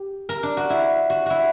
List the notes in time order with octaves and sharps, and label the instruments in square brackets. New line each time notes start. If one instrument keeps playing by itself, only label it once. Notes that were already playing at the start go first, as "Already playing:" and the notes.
Already playing: [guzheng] G4
A#4
D4
F#4
E4
F#4
E4 F#4